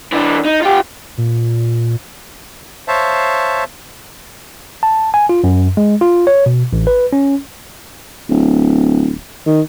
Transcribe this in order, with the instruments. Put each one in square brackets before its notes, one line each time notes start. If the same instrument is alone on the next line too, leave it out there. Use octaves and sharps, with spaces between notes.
[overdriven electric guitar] E3 D4
D#4
F4 G4
[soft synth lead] A#2
[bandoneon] C5 C#5 E5 F5 A5
[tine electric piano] A5
G#5
F4
F#2
G#3
F4
C#5
B2
A1
B4
C#4
[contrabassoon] D1
D#3